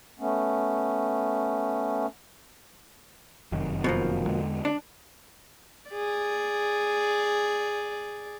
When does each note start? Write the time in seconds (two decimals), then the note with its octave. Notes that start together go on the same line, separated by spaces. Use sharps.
0.20 A3 B3 C#4
3.52 F1 F#2 D#3
3.84 B2 F3 A#3
4.27 E2 D3 G#3
4.65 D4
5.90 G#4 D5